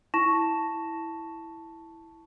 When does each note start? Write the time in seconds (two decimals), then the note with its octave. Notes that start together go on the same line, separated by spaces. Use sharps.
0.14 E4 A5 C#6 A#6 E7